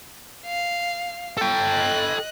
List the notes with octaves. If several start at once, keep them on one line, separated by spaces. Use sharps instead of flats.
F5
A4 G5
D#5 F#6